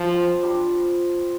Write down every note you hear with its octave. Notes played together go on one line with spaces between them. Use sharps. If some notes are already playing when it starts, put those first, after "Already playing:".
Already playing: F3
C4 F4 C5 F5
G3 D4 G4